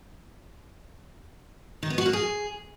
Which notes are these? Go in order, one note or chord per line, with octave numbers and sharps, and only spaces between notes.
D#3
B3
F#4
A#3
G#4